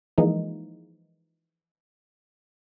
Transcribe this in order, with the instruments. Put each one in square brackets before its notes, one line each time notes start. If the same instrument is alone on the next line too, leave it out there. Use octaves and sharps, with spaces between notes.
[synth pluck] E3 F3 G#3 A#3 D#4